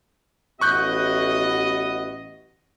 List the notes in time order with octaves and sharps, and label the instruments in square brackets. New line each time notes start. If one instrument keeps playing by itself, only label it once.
[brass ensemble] A1 B3 F#4 [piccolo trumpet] D#5 [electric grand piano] C#6 F#6 G6